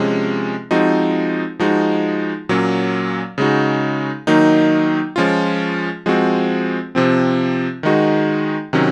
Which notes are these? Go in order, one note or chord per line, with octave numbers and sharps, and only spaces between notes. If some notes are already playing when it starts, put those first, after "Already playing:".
Already playing: C3 F3 G#3 C#4
F3 G#3 C4 D#4 F#4
F3 G#3 D#4 F#4
A#2 F#3 A#3 C#4
C#3 G#3 D#4 F#4
D#3 F#3 A#3 D#4
F3 G#3 C#4 F4
F3 G#3 C4 F#4
C3 F3 C4
D#3 G#3 D#4 F#4
C3 D#3 F#3 C#4